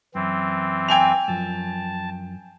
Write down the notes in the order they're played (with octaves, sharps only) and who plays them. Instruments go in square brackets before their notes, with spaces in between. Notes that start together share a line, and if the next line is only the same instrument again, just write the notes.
[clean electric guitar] F#2 [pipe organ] E3 C4
[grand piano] G5 G#5 F7
[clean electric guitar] F#2 F3 [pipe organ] A5